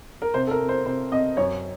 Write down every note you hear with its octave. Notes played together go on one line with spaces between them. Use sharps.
A#4
C3 C5
A4
A#4
C4
C5
C3 C5
C4 D#5
F#2 C#5